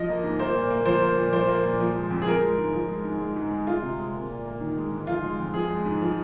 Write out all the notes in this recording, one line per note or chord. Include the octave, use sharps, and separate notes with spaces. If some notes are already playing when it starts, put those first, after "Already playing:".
Already playing: F3 D#5
A#3
G#2
A#3 C5
A#2
A#3
F3 C5
A#3
A#2
F3 C5
A#3
A#2
F3
G#3
F2
G#4
F3 A#4
G#3
G#2
F3
G#3
G#2
G#3
G#2
G#3
G#3 F4
C3
G#3
A#3
A#2
A#3
D#3
G#3
G#2
F3 F4
G#3
F2
F3 G#4
G#3
G#2
F3